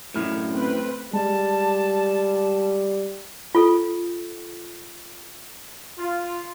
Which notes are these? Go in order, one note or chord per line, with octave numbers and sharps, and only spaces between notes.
F#2 A2 C#4 E4 F6
A3 C4 B4
G3 G#3 A5
F4 A4
F4